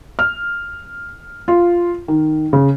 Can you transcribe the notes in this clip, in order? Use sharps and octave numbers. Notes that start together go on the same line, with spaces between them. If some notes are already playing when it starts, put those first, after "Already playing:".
F6
F4
D#3
C#3